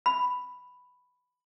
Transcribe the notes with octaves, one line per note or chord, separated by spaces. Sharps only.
B5